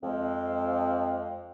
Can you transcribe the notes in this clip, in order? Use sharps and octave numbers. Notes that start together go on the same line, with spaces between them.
F2 G#3 C4